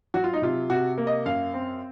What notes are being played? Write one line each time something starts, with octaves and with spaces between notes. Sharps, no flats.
F#3 F#4
F4
D#4
C3 F4
C3 F#4
A#3
D#5
F#2 F5
C4